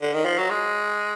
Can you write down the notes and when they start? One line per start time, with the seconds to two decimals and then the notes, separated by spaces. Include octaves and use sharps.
0.02 D3
0.13 D#3
0.25 F3
0.38 F#3
0.51 G#3